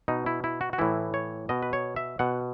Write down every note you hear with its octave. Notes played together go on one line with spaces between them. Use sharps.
B2 D#4
E4
E4
F#4
F#4
A2 E3 E4
C#5
B2 D#5
B4
C#5
E5
B2 F#5